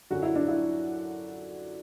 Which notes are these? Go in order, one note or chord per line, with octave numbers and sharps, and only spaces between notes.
F#2 D3 F#3 F#4
E4
D4
E4